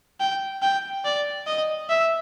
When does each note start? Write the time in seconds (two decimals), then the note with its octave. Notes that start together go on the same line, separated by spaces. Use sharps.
0.20 G5
0.62 G5
1.05 D5
1.47 D#5
1.89 E5